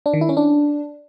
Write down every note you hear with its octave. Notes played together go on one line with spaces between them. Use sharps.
D4
D#3
E4
C#4
D4